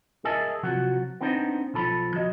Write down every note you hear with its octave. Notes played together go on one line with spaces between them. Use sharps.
G#4 A#4 D#5 E5 G#5 A5
C3 F3 F#3 F#4
B3 C4 D4 D#4 C5
B1 F3 A4 B5
F3 F#3 D#5